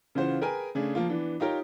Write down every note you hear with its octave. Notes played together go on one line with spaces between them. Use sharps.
C#3 E3 C#4 F4 F#4 C5
G#4 A#4 B4 G5 G#5
C#3 A3 D4 G#4
F3 A#3 F4
E3 B3 D4
D#4 F4 G4 A#4 C#5